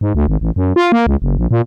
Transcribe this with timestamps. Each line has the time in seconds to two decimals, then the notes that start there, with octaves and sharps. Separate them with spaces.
0.01 G#2
0.15 D2
0.28 G#1
0.41 A1
0.56 F#2
0.76 F4
0.92 A#3
1.07 C#2
1.22 F#1
1.38 A#1
1.51 A#2